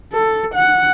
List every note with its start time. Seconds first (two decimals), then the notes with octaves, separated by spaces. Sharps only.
0.13 A4
0.55 F#5